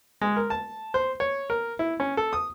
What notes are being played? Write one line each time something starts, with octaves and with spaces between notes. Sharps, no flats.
G#3
A#4
A5
C5
C#5
A#4
E4
C#4
A4
D#6